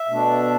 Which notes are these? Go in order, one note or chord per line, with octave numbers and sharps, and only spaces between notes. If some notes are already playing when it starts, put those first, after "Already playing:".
Already playing: E5
B2 A3 D4